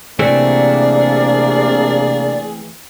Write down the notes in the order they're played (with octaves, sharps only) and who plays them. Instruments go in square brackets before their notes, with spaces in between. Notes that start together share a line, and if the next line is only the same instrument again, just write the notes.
[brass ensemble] C3 A#3 D4 [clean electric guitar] E3 A3 C4 [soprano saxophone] G#4 [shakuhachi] D5